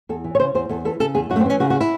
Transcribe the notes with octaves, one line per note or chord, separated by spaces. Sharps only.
E2 A4
E3
C#5
C#3 C5
E2 C5
E2 A4
E3 A4
C#3 A4
E2 G#4
F#2 F#4
A3
C4
E3 C#4
C#3 F#4
F#4
E4